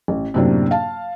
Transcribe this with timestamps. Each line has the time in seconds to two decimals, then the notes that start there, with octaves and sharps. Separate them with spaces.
0.08 A1
0.34 F#2 A2 C3 A#3 D4
0.71 F5 A5